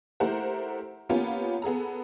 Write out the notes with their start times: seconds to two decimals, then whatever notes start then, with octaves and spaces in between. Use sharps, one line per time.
0.20 A3 E4 G4 A#4 C5 F#5
1.09 A#3 B3 C#4 F4 G4
1.62 B3 G#4 A4 A#5